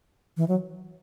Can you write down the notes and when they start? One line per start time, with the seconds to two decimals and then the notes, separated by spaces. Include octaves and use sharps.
0.37 E3
0.48 F#3